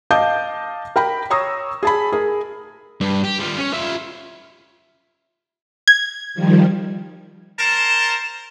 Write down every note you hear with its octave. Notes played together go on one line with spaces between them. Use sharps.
D#5 F5 A5 D6 G6
A#4 G5 B5
C#5 A#5 C#6 D#6 E6 A#6
G#4 A5 B5
G#4 A#4
G2
G4
G3 F4
C#4 C#5
F4 E5
G#6
D#3 F3 G3
A#4 C5 A5